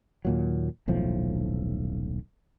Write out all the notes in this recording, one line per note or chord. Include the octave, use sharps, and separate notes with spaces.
D#2 A#2 F#3
D#1 B1 A2 F3